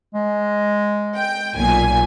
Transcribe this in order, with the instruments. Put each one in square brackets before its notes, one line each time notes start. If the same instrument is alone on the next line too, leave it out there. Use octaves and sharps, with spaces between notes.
[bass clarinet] G#3
[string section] G5
B1 A#2 G#5